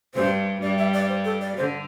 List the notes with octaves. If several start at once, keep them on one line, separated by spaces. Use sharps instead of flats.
G2 G3 C5
G2 G3 D5
E5
D5
C5
A4
D5
D3 C5